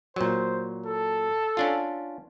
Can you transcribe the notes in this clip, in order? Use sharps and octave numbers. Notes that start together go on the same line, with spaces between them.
A#2 F#3 C5
A4
C#4 D4 F4